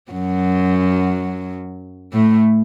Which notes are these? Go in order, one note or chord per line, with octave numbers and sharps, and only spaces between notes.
F#2 F#3
A2 A3